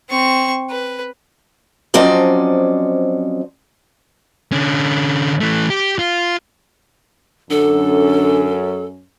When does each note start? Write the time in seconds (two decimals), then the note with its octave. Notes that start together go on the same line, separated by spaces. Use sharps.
0.10 C4 C#6
0.70 B4
1.94 F3 F#3 C4 C#4 D5 D#5
4.52 D3 C#4
5.41 E3 A3
5.70 G4
5.99 F4
7.51 F#2 D3 C#4 A4